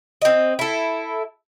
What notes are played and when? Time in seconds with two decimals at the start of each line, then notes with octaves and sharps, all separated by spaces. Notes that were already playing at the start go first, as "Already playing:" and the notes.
0.22 C4 D#5
0.59 E4 A4